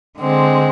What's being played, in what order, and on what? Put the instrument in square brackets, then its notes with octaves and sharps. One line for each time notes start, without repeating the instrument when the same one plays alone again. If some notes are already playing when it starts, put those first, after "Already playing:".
[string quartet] D3 G#3 C4